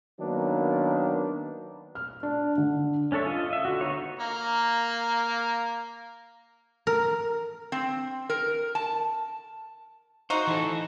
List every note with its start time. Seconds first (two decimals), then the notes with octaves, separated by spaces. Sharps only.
0.20 D#3 F#3 A#3 B3 D4
1.95 F6
2.23 D4
2.58 D3
3.12 C#4 D4 A4 C#5 E5
3.26 F4 D#5
3.50 D#5 E5
3.65 D3 F#4
3.81 B3 D#4 C#5
4.19 A#3 A#5
6.87 A#4
7.72 C4
8.29 A#4
8.75 A5
10.30 D#4 F#4 C5
10.47 E3 A4